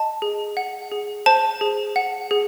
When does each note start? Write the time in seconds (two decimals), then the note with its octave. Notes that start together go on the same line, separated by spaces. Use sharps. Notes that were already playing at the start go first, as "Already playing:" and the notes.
Already playing: D#5 A5
0.22 G#4
0.57 F#5
0.92 G#4
1.26 C5 A5
1.61 G#4
1.96 F#5
2.31 G#4